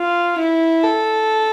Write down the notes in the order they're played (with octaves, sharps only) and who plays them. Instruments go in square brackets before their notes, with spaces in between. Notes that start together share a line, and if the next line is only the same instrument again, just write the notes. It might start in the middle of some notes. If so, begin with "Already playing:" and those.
Already playing: [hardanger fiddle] F4
E4
A4